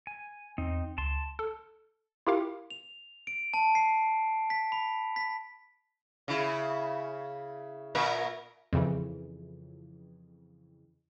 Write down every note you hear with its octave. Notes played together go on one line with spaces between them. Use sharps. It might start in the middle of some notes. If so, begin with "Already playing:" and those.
G#5
E2 C4 D#4
C#2 A5 C6
A4
E4 F4 G4 A#4 F5
F7
D7
A5
C7
B6
B5
B6
C#3 E4
A#2 A#4 E5
F2 C#3 E3